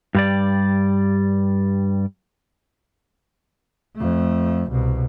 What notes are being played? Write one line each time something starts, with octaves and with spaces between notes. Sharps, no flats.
G2 G3 D5
F2 A3
C2 B2